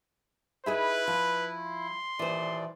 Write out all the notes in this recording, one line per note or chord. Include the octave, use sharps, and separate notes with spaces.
D#4 E4 G#4 B4 E5
F3
C6
D#2 A#2 E3 C5 D5